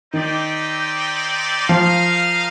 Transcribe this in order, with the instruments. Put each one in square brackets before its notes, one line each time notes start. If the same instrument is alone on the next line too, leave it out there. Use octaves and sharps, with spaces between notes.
[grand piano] D#3 [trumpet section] C4 D#4 G4 D5 G5
[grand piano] F3 [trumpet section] D#4 A#4 F5